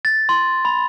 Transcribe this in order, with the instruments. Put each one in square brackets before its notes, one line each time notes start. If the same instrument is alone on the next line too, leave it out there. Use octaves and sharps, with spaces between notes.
[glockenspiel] A6
C6
B5